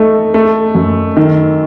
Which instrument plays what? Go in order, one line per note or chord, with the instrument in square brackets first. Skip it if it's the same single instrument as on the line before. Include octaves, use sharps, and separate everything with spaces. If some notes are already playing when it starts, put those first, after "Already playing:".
Already playing: [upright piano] A3 D#4
A3
F#2
D#3